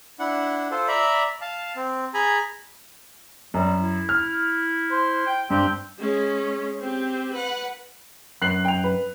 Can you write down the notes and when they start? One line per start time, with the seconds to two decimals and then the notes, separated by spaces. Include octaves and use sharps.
0.19 D4 E4 F#5
0.71 F4 A4 C5
0.88 D5 E5 A#5 B5
1.41 F5 A5
1.76 C4
2.14 G#4 G#5 A#5 B5
3.54 F#2 G3
3.79 E4
4.09 F6
4.91 C5
5.26 G5
5.50 G2 C4 G4
5.99 G#3 C#4
6.80 C4 G4
7.32 B4 F#5
8.42 F#2 F#6 C7 F#7
8.65 G5 F7
8.84 B4